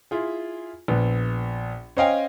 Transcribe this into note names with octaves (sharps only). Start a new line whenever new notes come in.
E4 F4 G#4
A#1 B3
C#4 C5 D#5 F5 G5 G#5